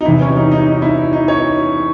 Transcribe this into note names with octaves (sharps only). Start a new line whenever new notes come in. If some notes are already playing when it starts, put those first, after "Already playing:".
D#4
E2 C3 E3 E4
C#4
D#4
D#4
D#4
E4
D#4
C#5